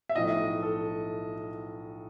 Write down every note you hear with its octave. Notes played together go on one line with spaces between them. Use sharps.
E5
B1 A2 F3 D#5
A4